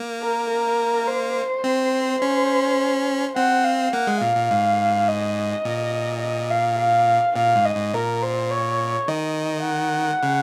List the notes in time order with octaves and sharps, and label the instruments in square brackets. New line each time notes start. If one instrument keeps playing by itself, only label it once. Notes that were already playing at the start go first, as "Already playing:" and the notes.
Already playing: [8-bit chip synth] A#3
[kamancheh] A#4
A#4
C5
[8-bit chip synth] C4
C#4
[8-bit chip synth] C4 [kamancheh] F#5
[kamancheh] F5
[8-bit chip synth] A#3 [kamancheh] F#5
[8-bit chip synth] G#3
[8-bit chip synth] A#2 [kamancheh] F5
[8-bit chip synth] A#2
G#2
[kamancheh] D#5
[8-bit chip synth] A#2
[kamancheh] D#5
F5
F5
[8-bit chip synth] A#2 [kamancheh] F5
[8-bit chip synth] G#2
[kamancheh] D#5
[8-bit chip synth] G#2
[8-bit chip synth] A#2 [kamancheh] A#4
[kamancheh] C5
C#5
[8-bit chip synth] D#3 [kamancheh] D#5
[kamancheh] F#5
[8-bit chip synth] C#3